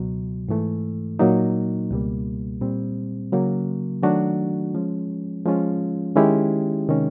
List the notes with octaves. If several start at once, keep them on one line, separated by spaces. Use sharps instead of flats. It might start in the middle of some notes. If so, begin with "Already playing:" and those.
Already playing: C#2 B2 F#3
G#2 E3 A3
A#2 F#3 A#3 D#4
C#2 B2 G3 A#3
A#2 G3 C4
C#3 F#3 A#3
D#3 F#3 A3 D4 F#4
F3 G#3 C#4
F3 G#3 C#4 F4
D#3 G#3 C#4 E4 G4
C3 D#3 G#3 C#4